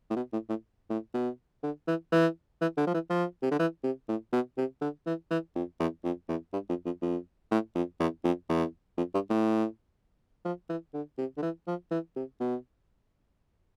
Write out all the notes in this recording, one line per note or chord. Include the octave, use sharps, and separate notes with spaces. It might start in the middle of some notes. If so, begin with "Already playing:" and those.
A2
B2
A2
A2
A2
B2
D3
E3
E3
E3
D3
F3
E3
F3
C3
D3
E3
C3
A2
B2
C3
D3
E3
E3
F2
E2
F2
E2
G2
F2
F2
F2
A2
F2
E2
F2
E2
F2
G2
A2
F3
E3
D3
C3
D3
E3
F3
E3
C3
B2